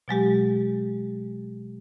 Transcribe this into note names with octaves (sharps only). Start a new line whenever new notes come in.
B2 F#3 G#3 G4